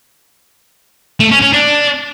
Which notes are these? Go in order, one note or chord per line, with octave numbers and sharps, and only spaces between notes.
A3
C#4
C#4
D4